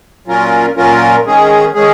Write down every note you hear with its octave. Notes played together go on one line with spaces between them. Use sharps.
A#2 F#3 C#4 F4 A#4
A#2 F#3 C#4 F4 A#4
D#3 G#3 C#4 G#4
D#3 G#3 C#4 G#4